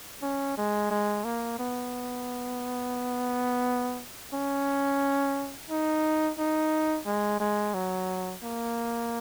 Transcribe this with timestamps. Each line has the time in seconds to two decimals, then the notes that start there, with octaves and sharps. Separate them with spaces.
0.22 C#4
0.57 G#3
0.91 G#3
1.25 A#3
1.59 B3
4.33 C#4
5.70 D#4
6.39 D#4
7.06 G#3
7.40 G#3
7.74 F#3
8.44 A#3